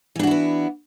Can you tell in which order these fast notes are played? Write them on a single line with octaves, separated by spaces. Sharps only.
E3 D4 F#4 E4 B3